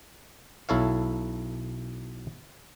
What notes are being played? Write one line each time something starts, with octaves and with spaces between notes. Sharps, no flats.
B1 E4 A4 C#5 F5